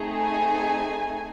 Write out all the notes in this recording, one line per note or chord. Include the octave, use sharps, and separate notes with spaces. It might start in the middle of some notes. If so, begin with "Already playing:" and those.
Already playing: A3 C4 D#4 G#4
G#5